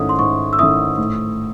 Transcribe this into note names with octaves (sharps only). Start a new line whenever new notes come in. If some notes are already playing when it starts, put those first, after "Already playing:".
Already playing: G#2 D#3 A3 C#4 E4 D#6
C6
G#2 C#6
E6
D#3 A3 C#4 E4 D#6
A2